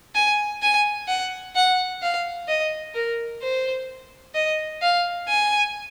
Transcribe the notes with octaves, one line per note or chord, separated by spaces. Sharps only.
G#5
G#5
F#5
F#5
F5
D#5
A#4
C5
D#5
F5
G#5